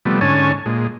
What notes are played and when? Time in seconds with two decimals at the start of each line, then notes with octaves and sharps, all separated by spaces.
0.05 C3 F3 G3 A3 B3
0.21 G#2 D3 C#4 C#5 G#5 A5
0.66 A#2 G#3